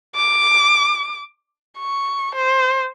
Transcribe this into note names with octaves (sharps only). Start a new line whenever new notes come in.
D6
C#6
C5